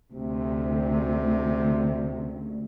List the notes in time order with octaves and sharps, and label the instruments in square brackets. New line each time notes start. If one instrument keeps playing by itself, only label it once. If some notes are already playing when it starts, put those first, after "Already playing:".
[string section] D2 [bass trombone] C3